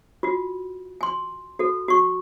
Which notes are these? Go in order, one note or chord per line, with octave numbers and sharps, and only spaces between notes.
F4 F#4
G#5 C6
F#4 A4
F#4 C#6